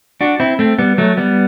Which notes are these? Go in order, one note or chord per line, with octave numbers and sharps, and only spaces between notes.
D4 F#4
C4 E4
A3 C4
G3 B3
F#3 A3
G3 B3